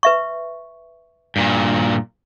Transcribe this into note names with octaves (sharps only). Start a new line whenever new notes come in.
B4 E5 C#6
G2 A#2